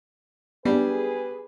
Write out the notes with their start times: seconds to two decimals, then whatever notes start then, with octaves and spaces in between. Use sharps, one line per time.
0.65 G3 B3 D4 G#4 B4